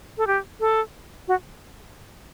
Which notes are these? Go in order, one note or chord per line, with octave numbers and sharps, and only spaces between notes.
A4
G4
A4
F#4